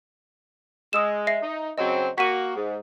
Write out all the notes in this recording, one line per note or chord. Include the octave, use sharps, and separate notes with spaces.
G#3 D#6 E6 E7
E5 A#6 C7
D#4
C#3 F#3 C4 D#5
A#3 F#4 B6 D#7
G#2